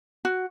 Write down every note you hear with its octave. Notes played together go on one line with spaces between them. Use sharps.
F#4